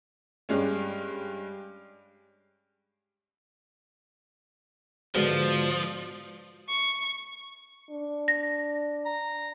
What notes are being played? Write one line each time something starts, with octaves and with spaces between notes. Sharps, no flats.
G2 G#3 C#4
G#2 B2 D3 F3
C#6
D4
A#6
A#5